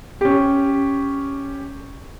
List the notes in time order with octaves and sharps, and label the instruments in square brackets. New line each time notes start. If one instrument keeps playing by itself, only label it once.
[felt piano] C#4 G4